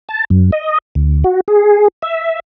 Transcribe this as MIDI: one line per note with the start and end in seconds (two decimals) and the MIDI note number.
0.09 0.24 81
0.30 0.51 42
0.52 0.78 75
0.95 1.24 38
1.24 1.40 66
1.48 1.88 68
2.02 2.40 76